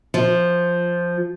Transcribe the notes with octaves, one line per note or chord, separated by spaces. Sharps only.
F3